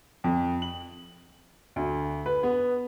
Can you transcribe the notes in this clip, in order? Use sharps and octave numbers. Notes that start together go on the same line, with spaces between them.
F2
F#7
D2
B4
B3